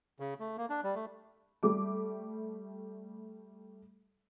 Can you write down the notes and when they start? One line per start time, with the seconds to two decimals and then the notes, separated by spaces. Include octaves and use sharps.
0.20 C#3
0.40 A3
0.57 A#3
0.70 D4
0.84 G3
0.95 A3
1.63 G3 A3 D6